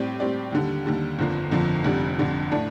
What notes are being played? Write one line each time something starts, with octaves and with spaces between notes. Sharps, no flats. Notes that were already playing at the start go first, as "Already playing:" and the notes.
Already playing: A2 G3 C4 G4 D5
A2 G3 C4 G4 D5
D#2 D3 G3
D#2 D3 G3
G1 F2 D3 F3 A#3
G1 F2 D3 F3 A#3
F1 F2 D3 G3
F1 F2 D3 G3
A2 A3 D4